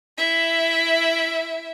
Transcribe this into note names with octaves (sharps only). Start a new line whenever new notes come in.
E4 E5